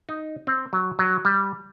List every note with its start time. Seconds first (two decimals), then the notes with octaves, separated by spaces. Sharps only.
0.09 D#4
0.47 C4
0.73 F#3
0.99 F#3
1.25 G3